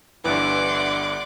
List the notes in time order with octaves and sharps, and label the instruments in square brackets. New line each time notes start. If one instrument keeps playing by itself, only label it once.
[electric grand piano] G1 G2 [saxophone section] E3 [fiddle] D5 F#5 [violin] C6 D6